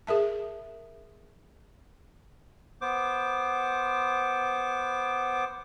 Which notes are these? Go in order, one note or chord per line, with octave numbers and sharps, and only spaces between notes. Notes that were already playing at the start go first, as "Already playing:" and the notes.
G#4 A#4 E5 A5
B3 C5 D6